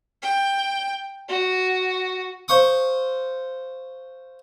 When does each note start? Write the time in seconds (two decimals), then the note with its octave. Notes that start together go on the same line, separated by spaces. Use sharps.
0.22 G5
1.29 F#4
2.48 C5 F5 C#6 D#6